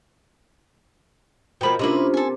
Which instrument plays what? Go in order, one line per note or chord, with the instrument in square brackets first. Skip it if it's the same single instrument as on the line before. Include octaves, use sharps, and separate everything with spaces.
[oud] B2 F3 A#3 [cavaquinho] G5 B5
[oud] C3 A#3 [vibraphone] C#4 D4 F4 [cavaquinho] E4 B4 D#5
[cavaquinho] A4 G#5